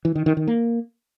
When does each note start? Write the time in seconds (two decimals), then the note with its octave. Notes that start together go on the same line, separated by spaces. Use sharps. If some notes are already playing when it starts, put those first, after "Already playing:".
0.05 E3
0.15 D#3
0.26 D#3
0.37 D#3
0.48 A#3